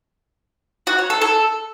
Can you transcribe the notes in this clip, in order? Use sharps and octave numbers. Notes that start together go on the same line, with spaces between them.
F#4
C#5
A4
A4